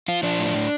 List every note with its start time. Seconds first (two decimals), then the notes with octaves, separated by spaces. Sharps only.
0.08 F3 F4
0.23 F3 D4
0.39 A2
0.55 A2